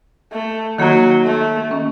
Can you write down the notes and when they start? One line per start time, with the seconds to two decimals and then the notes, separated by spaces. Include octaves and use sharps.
0.32 A3
0.78 D#3 F#3 A#3 D#4 F#4
1.25 A3
1.71 D#3 A#3 C#4